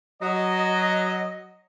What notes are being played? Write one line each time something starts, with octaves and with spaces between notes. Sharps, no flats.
F#3 D#5